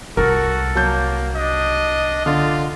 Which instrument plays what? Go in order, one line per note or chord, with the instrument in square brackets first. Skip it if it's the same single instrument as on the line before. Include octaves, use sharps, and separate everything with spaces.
[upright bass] C2 [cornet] F#4 [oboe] A4 [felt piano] A#4
[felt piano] F#3 A5 G6 [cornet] A#3
[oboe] D4 [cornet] D#5
[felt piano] D3 [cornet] F4 [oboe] D5